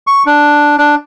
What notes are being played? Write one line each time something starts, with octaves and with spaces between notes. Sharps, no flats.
C#6
D4
D4